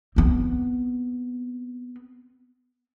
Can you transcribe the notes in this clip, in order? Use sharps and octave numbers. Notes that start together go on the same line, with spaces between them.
B3 C4